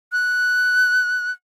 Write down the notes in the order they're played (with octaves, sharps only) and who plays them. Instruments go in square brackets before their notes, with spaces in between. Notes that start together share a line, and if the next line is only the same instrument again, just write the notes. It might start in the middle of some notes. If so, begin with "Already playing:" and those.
[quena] F#6